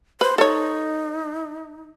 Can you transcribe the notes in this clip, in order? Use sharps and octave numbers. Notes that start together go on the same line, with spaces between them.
B4 C5
D#4 A4 C#5